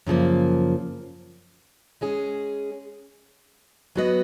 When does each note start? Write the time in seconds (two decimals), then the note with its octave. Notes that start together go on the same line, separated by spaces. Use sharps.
0.06 F#2 C#3 F3 A#3
2.01 G#3 C#4 G#4
3.95 F#3 B3 F#4 B4 D#5